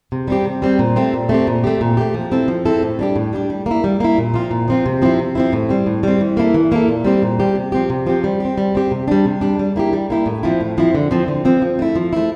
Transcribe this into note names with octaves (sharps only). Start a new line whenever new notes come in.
C3
G3 C4 G4
C3
G3 C4 G4
A#2
A3 C4 G4
A#2
A3 C4 G4
A#2
A3 C4 G4
A#2
A3 C4 G4
F3
C4 E4 A4
F3
C4 E4 A4
A2
G3 D4 G4
A2
G3 D4 G4
G3
A#3 E4
G3
A#3 E4
A#2
F3 C4 F4
A#2
F3 C4 F4
C3
F3 C4 E4
C3
F3 C4 E4
A2
G3 C4
A2
G3 C4
E3
A#3 E4 A4
E3
A#3 E4 A4
A#2
G3 C4 G4
A#2
G3 C4 G4
C3
F3 C4 G4
C3
F3 C4 G4
G3
C4 G4
G3
C4 G4
C3
G3 D4
C3
G3 D4
G3
A#3 E4 G4
G3
A#3 E4 G4
A2
F3 C4 E4
A2
F3 C4 E4
D3
F3 C4
D3
F3 C4
F3
A3 E4
F3
A3 E4